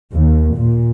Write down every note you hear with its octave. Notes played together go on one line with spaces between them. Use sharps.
D#2
A#2